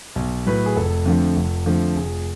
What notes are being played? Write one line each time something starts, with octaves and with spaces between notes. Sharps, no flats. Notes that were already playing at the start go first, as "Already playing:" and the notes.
B1
A2 F#3 B4
G#4
F1 A4
F2 D3 F3 A3
F1
F2 D3 F3 A3
F1 G#4